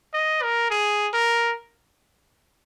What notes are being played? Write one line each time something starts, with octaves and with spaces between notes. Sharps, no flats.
D#5
A#4
G#4
A#4